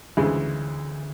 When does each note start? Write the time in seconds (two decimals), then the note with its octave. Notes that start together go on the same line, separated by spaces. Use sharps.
0.17 D2 C#3 E3 G#3